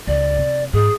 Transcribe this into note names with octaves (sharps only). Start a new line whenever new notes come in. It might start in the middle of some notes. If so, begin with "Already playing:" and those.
C#2 D5
C3
G#2 G#4